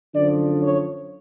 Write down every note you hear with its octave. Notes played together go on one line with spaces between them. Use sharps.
F#2 D3 F3 D5
C#5